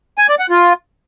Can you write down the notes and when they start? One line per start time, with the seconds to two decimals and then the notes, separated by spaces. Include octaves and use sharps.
0.18 G#5
0.29 D5
0.39 F#5
0.50 F4